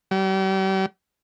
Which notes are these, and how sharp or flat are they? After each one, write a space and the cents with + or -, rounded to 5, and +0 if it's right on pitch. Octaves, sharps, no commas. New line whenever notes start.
G3 -40